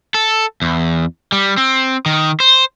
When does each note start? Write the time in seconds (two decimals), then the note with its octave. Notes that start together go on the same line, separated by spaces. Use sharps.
0.14 A4
0.62 E2
1.32 G3
1.58 C4
2.06 D#3
2.40 C5